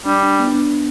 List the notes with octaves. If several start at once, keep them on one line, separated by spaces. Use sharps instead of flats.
G3 D4
D4
B3
D4
B3